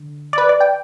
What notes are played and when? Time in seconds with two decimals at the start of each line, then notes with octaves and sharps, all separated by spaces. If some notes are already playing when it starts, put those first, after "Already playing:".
Already playing: D3
0.33 D5
0.38 B4
0.49 D5
0.60 G5